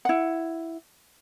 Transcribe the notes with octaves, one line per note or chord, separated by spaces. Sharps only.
E4 F#5